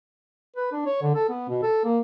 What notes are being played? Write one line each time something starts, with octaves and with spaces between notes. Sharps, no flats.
B4
D4
C#5
D3
A4
B3
B2
A4
A#3